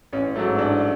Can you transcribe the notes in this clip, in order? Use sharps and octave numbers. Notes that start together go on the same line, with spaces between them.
A1 C#4
G#2 F#3 A3
A1 D4